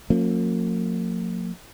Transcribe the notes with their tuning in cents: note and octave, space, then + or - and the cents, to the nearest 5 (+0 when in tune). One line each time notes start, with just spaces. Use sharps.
F3 +40 A#3 -40 C#4 -25